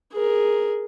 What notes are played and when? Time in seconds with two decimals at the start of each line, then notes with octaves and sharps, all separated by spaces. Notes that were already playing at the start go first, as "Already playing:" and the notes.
0.13 G#4 A#4